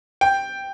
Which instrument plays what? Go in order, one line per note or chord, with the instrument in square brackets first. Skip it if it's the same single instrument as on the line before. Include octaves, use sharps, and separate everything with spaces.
[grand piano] G5